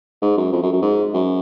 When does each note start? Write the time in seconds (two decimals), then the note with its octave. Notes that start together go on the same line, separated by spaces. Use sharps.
0.22 G#2
0.37 F#2
0.52 F2
0.62 F#2
0.73 F#2
0.82 G#2
1.13 F#2